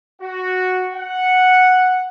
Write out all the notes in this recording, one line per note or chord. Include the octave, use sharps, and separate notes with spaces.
F#4
F#5